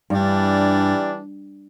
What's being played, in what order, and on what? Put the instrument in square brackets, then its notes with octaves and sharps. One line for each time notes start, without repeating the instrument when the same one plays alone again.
[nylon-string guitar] G2 [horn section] E3 G3 D4